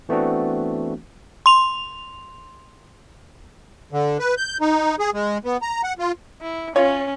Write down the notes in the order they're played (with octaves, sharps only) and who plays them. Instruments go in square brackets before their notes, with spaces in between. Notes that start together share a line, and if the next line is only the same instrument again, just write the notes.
[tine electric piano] E3 A3 B3 C4 D4 F#4
[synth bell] C6 F7
[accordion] D3
B4
G6
D#4
G#4
G#3
B3
A#5
F#5
F4
[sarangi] E4
[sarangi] C#4 [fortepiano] F4 C#5